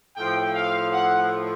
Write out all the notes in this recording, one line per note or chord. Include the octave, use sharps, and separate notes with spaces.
A2 F3 G5
F5
F#5